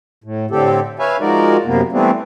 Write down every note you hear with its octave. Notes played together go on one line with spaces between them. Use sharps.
A2
A2 D3 C4 G4 A4
B4 C#5 E5 F5 G#5
F3 G#3 D#4 F#4 A#4 D5
F#2 C3 A#3 B3
E3 G3 A3 B3 C4 D4